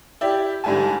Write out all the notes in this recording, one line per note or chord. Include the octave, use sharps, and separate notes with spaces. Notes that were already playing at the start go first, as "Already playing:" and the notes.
E4 G4 D5
G#2 D3 G3 E4 G#5 A5